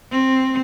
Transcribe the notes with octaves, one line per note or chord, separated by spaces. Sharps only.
C4